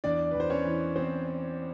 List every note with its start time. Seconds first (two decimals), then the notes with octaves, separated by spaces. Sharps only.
0.04 E2 D4 D5
0.31 E2 B4
0.40 C5
0.50 C#4 C#5
0.65 E3
0.96 E2 C4 C5